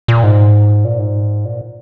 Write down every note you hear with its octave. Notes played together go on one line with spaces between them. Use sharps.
A#2
G#2
A#2
G#2
A#2